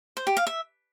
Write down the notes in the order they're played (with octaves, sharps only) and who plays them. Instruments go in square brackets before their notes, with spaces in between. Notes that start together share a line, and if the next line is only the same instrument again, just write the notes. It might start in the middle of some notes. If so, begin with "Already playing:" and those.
[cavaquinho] C5
G4
F5
E5